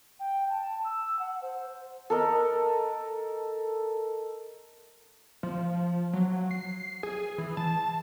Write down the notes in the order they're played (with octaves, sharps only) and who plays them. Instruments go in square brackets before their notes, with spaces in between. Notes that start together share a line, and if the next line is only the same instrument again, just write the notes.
[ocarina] G5
A5
E6
F#5
C5
[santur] A4 A#4 D#5
[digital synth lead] F3
F#3
C7
G#4
E3
A5